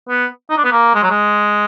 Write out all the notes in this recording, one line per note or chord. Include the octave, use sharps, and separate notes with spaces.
B3
D#4
D4
B3
A#3
G#3
F#3
G#3